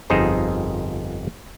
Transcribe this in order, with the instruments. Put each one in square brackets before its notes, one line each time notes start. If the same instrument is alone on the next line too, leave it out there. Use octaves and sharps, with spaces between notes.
[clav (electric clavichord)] G1 F2 D#4 G#4 C5 A#5